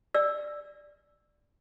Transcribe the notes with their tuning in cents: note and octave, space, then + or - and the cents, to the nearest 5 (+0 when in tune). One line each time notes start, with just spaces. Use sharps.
D5 +0 E6 +0